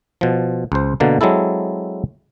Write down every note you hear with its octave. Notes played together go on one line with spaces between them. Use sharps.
B2 F3
C#2 C5
B2 D3 A#3
F#3 G#3 C4 E4 A4